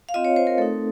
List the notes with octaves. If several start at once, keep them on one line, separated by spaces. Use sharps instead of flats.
F5
C4 F4 D#5
C#5
C5
A#4
A3 C4 D#4 A4